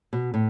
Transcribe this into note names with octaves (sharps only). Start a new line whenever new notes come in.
B2
A2